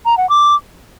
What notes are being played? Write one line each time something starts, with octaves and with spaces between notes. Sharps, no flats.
A#5
F#5
D6